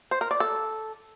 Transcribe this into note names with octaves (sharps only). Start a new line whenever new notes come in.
C5
A#4
D5
A4